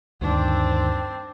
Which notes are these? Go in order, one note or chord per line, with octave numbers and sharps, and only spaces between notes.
D2 G2 D#3 C4 D4